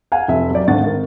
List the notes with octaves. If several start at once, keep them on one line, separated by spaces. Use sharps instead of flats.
F5 F#5 G#5
F1 E5
F#3 D5
G#1 D2 G2 F#5 A6
G#1 A#4